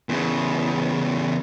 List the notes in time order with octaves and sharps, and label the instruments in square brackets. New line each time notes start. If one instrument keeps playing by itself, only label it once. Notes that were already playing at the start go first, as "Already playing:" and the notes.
[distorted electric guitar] E2 C#3